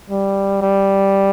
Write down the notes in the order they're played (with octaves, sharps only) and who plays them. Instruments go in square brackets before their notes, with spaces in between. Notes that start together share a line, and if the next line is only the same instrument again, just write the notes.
[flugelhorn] G3
G3